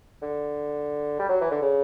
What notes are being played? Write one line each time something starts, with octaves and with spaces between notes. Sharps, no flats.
D3
G3
F#3
E3
D3
C#3